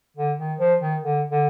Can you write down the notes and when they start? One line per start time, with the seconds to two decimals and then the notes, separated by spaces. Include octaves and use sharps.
0.17 D3
0.38 D#3
0.59 F3
0.81 D#3
1.02 D3
1.31 D3